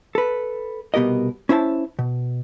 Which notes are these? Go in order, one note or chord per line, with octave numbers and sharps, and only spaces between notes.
A4 B4
C2 B2 B3 G4 A#4 D#5
C#4 E4 C5 E5 A5
B2